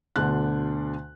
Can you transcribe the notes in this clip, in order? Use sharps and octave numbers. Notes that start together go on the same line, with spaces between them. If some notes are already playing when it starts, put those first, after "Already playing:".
D2 B2 D3 D4 F#6